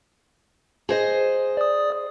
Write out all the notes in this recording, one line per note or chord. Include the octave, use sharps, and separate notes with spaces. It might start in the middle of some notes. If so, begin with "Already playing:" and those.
G#4 C5 D#5
D5 D#6